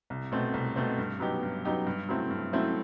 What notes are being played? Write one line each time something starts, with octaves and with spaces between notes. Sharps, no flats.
C2
B2 A3 C4
C2
B2 A3 C4
G2
F#3 B3 D#4 G4
G2
F#3 B3 D#4 G4
G2
F#3 A3 C4 E4
G2
F#3 A3 C4 E4